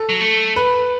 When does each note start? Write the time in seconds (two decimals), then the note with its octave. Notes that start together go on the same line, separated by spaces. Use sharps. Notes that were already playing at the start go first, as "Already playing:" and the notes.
Already playing: A4
0.09 F#3
0.21 A3
0.56 B4